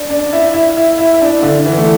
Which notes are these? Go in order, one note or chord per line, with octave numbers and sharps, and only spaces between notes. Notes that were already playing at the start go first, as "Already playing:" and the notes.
Already playing: D4
D4
E4
E4
E4
E4
E4
D4
D3
E3
A3